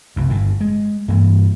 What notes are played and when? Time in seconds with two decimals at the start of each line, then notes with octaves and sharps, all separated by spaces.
0.16 F1 C2 F#2
0.30 G1 A2
0.61 G#3
1.08 G2 E3 A#3